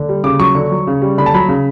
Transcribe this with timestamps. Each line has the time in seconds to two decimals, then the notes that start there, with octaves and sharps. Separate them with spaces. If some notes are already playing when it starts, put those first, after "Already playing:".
Already playing: D3
0.09 G3
0.24 C#3 D6
0.40 F#3 C#6
0.55 D3
0.71 F#3
0.87 C#3
1.02 G3
1.18 D3 B5
1.26 A5
1.34 F#3 B5
1.49 C#3